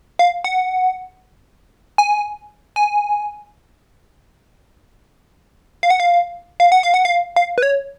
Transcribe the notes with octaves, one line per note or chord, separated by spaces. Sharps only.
F5
F#5
G#5
G#5
F5
F#5
F5
F5
F#5
F5
F#5
F5
F5
B4
C#5